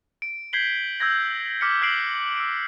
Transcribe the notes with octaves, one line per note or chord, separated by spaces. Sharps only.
D7
G6 G#6 B6 C7 F#7 G7
E6 G6 G#6 A#6
D6 F6 B6 C#7
E6 F#6 G6 C7 D7 F#7
E6 D7